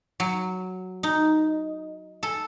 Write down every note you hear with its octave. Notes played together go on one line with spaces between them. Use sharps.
F#3
D#4
A4